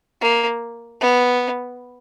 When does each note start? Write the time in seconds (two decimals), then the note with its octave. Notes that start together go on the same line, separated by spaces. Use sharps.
0.21 A#3
1.01 B3